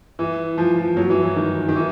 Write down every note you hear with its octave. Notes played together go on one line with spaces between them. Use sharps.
E3
F3
F3
F#3
E3
E3
D#3
D#3
E3